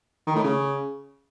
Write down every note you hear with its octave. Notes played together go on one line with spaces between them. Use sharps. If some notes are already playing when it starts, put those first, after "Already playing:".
D#3
A2
C#3